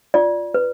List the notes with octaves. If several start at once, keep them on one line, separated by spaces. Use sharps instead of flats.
F4 D5
B4